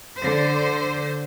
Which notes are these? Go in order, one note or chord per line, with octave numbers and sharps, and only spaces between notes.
D3 C5